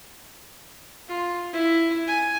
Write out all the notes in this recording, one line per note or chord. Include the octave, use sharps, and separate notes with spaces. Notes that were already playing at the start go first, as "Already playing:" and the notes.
F4
E4
G#5